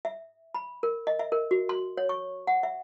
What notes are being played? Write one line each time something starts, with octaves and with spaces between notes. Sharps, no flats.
E5
B5
A#4
D#5
E5
A#4
F#4
C6
C#5
C#6
F#5
E5